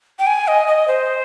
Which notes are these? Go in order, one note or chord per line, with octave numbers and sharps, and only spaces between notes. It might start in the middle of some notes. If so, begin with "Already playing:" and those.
G5
G#5
D#5
D#5
C5